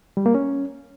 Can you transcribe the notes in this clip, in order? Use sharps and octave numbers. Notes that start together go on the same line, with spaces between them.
G3
A#3
C#4